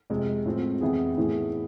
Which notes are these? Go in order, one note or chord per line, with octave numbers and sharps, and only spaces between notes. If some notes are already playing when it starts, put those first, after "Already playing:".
F2 C3 G#3
A2 F3 G#3 C4
F2 E3 B3 E4 G#4
A2 E3 B3 E4 G#4